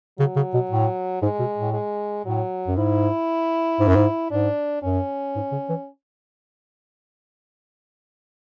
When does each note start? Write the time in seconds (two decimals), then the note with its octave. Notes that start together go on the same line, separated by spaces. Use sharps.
0.19 C#3 F#3
0.36 C#3
0.54 B2
0.71 A2
1.22 G#2 G#3
1.39 B2
1.57 A2
1.74 G#3
2.26 A2 F#3
2.67 F#2
2.77 G#2 E4
3.80 G#2
3.88 F#2
3.95 G#2
4.31 G#2 D4
4.83 F#2 C#4
5.35 G#2
5.52 C#3
5.69 E3